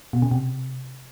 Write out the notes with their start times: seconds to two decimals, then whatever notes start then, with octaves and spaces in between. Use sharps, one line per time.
0.13 B2
0.22 C#3
0.31 C3